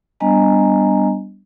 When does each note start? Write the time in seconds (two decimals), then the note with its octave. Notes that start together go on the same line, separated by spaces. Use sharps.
0.20 G3 B3 D4 D#5 G#5 A#5